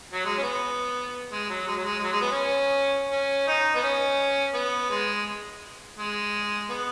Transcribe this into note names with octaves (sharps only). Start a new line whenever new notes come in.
F#3
G#3
C#4
B3
G#3
F#3
G#3
F#3
G#3
G#3
F#3
G#3
B3
C#4
C#4
D#4
B3
C#4
B3
G#3
G#3
B3